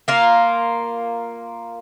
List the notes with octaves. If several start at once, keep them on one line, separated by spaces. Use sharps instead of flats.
A#3 F4